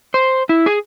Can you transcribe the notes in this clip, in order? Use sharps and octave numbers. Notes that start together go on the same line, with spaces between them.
C5
E4
G#4